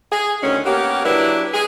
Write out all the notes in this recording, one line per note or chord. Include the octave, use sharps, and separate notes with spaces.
G#4
D2 D#3 C#4
A#3 B3 C#4 G4
F#3 D4 E4 G4 B4
G#4